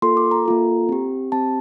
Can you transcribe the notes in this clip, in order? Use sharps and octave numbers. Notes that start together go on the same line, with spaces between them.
A#3 F4 A4 C6
D6
A#5
A#3 F4 A4
C4 G4
C4 G4 A5